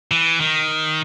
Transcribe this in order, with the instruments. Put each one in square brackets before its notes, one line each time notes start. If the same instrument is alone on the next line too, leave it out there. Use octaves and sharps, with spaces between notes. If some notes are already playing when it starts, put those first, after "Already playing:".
[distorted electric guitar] E3
D#3